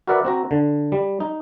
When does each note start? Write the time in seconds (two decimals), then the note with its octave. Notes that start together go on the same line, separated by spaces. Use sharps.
0.07 F#4 A#4 B4 D5 E5 F#5
0.25 C4 F#4 A#5
0.51 D3
0.92 G3
1.20 D#4